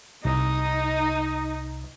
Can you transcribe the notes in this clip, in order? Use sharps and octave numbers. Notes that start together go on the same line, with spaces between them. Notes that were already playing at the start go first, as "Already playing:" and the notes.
C2 D#4